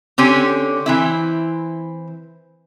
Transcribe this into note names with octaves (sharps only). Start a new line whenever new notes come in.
D3 C4 C#4 G4 G#5
E3 C4 E4